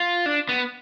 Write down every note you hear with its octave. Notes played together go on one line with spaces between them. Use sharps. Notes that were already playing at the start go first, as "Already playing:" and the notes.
Already playing: F4
D4
B3